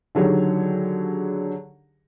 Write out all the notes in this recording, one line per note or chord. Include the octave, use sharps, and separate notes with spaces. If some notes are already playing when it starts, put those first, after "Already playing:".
D3 D#3 F#3 G4 G#4 C#5